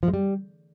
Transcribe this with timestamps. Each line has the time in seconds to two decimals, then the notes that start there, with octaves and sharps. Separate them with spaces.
0.03 F3
0.08 G#3
0.14 G3